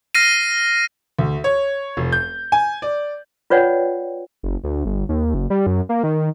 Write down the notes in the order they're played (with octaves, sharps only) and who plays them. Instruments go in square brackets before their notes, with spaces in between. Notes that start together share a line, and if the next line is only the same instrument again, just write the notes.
[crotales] F6 A#6 C7 D#7
[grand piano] D2
C#5
F1
G6
G#5
D5
[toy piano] F4 B4 C#5 D5 F#5 G5
[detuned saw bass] F#1
D2
G1
D#2
F#1
G3
F#2
A#3
D#3